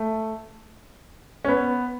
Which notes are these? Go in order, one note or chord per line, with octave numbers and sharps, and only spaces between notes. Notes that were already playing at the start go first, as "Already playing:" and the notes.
Already playing: A3
C#4
B3